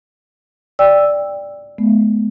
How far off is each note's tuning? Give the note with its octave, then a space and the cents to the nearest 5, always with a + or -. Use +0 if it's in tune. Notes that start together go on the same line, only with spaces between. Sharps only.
D5 +0 G5 +15 E6 +0
G#3 +45 B3 +0